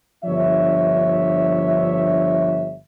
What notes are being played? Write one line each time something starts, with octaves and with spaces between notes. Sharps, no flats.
G1 F3 D4 C#5 E5